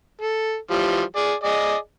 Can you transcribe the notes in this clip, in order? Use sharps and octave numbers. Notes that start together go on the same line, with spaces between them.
A4
E3 F3 G3
G#4 D5
G#4 D5 D#5